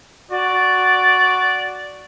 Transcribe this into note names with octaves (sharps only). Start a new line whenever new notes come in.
F#4 D5